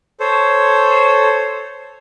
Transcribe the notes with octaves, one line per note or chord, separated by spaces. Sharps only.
A4 C5 C#5